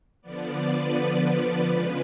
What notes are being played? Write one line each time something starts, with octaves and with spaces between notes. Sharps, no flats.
D3 F3 B3 D5
B4
C#3 F3 G#3